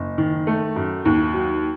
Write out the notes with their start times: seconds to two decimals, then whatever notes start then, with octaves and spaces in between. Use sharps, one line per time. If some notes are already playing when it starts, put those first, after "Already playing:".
Already playing: F#1
0.18 D#3
0.47 A3
0.76 F#2
1.05 D#2
1.34 F#3